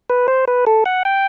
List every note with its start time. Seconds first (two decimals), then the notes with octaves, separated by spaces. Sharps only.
0.10 B4
0.28 C5
0.48 B4
0.67 A4
0.86 F#5
1.05 G5